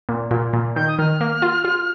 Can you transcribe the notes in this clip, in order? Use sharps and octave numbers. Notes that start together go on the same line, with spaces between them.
A#2
A#2
A#2
D#3 G6
D#6
D#3 F6
A#3
F4
F4